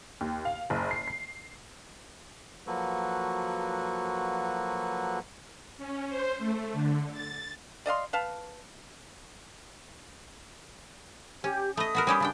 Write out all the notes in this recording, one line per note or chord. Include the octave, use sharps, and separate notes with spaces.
D#2
F5
F#1
C7
C7
F3 F#3 A#3 F#4 A4 B4
C#4
C5
A3
D3
A6
D5 D#5 F5 C6
B4 F5 A5
C#4 G4
A3 D#5 B5 D#6
B3 F#4 A#4
G3 C#4 G4
C#3 D4 G5